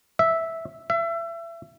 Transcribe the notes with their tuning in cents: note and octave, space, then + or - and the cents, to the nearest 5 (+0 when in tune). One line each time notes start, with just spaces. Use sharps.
E5 -5
E5 +30